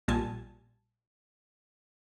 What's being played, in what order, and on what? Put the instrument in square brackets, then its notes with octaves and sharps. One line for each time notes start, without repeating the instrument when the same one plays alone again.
[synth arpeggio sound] A#1 A#2 G3 G#5 A5